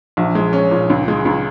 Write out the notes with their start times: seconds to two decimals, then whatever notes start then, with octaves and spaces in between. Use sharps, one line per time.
0.17 A#1
0.35 G#3
0.53 C#4
0.71 A#2
0.90 C#2
1.08 G#3
1.25 C#2